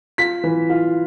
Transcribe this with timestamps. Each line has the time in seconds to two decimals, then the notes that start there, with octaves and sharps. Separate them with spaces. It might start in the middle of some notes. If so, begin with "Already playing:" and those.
0.18 F4 B6
0.44 E3
0.69 F4